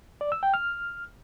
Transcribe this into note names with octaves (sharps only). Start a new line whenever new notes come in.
D5
E6
G5
F6